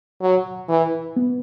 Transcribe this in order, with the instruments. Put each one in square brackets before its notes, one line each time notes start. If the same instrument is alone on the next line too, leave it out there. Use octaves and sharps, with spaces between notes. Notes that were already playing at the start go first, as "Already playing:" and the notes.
[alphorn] F#3
E3
[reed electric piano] B3